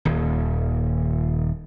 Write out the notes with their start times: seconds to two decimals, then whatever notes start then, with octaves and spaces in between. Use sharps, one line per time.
0.05 D#1 D#2